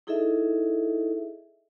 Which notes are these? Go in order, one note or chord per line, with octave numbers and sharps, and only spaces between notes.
D#4 E4 G#4 A4 D#5 E5